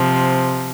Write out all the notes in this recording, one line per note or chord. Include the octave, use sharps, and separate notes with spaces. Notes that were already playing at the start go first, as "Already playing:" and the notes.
Already playing: C3 F3